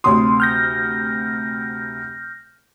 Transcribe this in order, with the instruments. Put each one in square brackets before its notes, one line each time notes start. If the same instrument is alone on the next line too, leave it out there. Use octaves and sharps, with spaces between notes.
[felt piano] D2 C3 D#6 [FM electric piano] C6
[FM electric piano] F6 G6 A#6